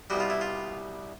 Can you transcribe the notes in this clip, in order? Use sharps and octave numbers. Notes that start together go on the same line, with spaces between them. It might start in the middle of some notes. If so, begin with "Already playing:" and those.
C2 B2 G3 F#4
F4
E4
F4